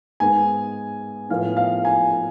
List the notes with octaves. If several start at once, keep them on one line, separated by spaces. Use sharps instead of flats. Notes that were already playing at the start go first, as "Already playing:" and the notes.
G#2 G#3 B3 G#5
A2 F3 B3 F5
F5
G#5